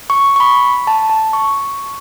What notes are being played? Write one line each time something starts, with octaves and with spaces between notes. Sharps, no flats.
C#6
C#6
B5
A5
A5
C#6